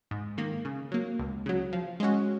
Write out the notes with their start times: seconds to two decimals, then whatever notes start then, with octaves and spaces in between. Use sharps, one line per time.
0.11 G#2
0.37 D#3 A#3
0.65 C#3
0.92 F#3 A#3
1.19 C#2
1.46 C#3 F#3
1.73 F3
2.00 G#3 C#4 F#4